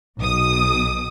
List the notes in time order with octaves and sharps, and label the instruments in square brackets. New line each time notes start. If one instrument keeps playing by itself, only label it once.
[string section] B1 B2 D#6